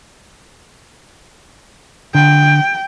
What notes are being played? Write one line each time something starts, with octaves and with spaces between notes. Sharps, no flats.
D3 G5